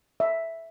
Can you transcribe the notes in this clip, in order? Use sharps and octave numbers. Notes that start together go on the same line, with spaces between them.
E5